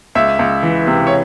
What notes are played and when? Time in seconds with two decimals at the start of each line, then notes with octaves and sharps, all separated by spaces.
0.15 C#2 E5
0.39 C#2
0.63 E3
0.87 C3
1.07 C#5